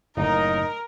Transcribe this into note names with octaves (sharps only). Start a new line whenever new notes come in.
F#1 A2 D#4 A#4